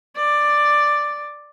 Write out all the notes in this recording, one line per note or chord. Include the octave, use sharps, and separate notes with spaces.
D5